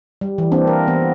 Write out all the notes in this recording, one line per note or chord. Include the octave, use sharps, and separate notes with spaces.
G3
E3
A#3 C4 D4
A#4
E3 B3